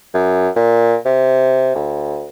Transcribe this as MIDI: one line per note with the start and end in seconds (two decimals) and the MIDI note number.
0.14 0.49 42
0.56 0.96 46
1.05 1.71 48
1.75 2.29 38